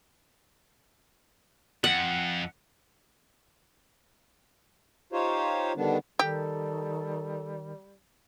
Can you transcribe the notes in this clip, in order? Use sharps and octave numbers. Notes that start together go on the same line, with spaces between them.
F2 F#5
D#4 F4 G4 C5 C#5
D3 D#3 G3 B3 D4
D#3 G3 G4 A4